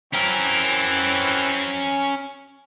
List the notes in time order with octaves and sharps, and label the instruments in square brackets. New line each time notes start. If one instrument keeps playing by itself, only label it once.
[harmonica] E3 C4 [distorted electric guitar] C#4 A#4